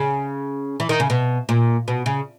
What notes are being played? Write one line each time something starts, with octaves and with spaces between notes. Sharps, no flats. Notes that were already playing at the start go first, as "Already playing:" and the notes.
Already playing: C#3
E3
D#3
C#3
B2
A#2
B2
C#3